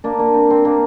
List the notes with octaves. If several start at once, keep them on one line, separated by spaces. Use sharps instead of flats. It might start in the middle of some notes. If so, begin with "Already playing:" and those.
A#3 D4
A#3 D4
C4
C4
A#3 D4